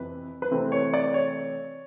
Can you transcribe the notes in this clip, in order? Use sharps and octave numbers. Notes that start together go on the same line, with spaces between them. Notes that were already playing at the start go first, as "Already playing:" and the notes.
Already playing: F2 C3 E3 B4
B4
C3 E3 A3 C4 C5
C#5
D5
C#5